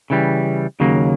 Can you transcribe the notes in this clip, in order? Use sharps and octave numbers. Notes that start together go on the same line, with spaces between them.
C#3 E3 G3
D#2 C#3 F#3 A#3